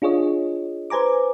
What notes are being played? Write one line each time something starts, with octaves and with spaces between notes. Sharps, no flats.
D4 F4 G#4 C#5 D#5
B4 C5 G#5 A#5 D6